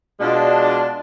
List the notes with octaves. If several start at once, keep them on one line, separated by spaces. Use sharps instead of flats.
B2 G#3 D4 F4